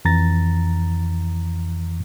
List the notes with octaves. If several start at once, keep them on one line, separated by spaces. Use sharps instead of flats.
F2 E3 A#5 A6 A#6